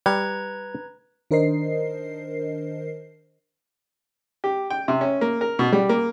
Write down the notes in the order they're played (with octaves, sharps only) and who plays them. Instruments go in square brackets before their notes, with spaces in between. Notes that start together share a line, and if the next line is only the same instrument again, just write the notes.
[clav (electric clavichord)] G3 [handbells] B4 A#5 G#6
[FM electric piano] D#3 D4 A#4 C5 D#5 C7
[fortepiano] G4
G5
C3
C#4
A#3
A#4
B2
G3
A#3